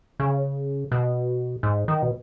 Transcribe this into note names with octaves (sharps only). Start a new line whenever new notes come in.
C#3
B2
G#2
D#3
B2